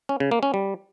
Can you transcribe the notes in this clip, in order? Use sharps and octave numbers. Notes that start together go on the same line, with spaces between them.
C#4
C#3
A#3
C#4
G3